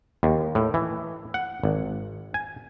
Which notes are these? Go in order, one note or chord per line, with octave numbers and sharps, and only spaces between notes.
D#2
A2
E3
F#5
G#1
G#5